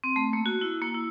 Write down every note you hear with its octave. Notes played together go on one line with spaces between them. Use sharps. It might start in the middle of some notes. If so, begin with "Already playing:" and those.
C4
A3
A#3
F#4
E4
A#3
E4